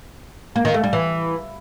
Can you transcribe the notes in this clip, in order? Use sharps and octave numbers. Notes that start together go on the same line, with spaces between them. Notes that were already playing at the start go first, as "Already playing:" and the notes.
A#3
D#3
A3
G3
E3